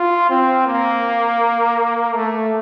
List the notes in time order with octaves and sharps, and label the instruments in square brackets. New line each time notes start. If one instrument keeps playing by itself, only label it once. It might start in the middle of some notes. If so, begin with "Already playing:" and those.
Already playing: [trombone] F4
C4
A#3
A3